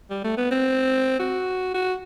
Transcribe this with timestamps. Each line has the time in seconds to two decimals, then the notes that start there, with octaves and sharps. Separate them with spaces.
0.10 G3
0.24 A3
0.37 B3
0.51 C4
1.20 F#4
1.75 F#4